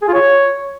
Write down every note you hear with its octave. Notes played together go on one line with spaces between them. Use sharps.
G#4
F4
C#5